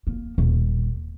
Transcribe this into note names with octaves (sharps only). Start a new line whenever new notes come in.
A#3
D#1